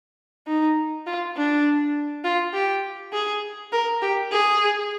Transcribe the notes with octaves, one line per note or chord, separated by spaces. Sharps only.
D#4
F4
D4
F4
G4
G#4
A#4
G4
G#4